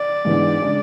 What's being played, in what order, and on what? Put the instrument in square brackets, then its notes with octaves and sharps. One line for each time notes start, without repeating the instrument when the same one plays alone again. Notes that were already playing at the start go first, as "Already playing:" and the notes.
Already playing: [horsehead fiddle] D5
[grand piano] G#2 E3 G#3 B3 D4
C#3 G#3 D4